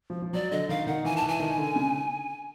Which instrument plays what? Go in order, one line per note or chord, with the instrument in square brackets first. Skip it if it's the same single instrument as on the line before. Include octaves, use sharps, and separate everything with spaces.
[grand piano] F3
F3
[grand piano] F#3 [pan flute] D5
[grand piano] D3 [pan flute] D#5
[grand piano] D#3 [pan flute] F5
[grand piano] D#3 [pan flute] F#5
[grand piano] E3 [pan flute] G#5
[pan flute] A5
[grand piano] E3
[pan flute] G#5
[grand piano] D#3
D3
C#3